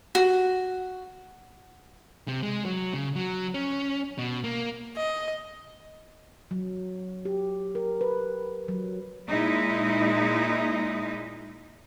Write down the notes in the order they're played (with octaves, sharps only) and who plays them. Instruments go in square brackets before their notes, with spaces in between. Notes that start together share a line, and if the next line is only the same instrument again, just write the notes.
[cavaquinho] F#4
[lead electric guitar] C3
G#3
F#3
C#3
F#3
C#4
B2
A#3
[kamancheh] D#5
[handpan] F#3
G4
A#4
B4
F#3
[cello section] A#2 G#3 D#4 E4